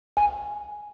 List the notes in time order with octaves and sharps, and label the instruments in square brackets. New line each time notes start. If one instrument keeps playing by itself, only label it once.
[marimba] G#5